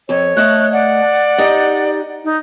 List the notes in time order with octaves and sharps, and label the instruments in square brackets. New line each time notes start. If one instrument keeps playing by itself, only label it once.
[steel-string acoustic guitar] F2 [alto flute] C#5
[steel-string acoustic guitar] A3 D#5 A5 [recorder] F#6
[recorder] D5 [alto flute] F#5
[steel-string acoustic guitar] D#4 G4 D#5
[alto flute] D#4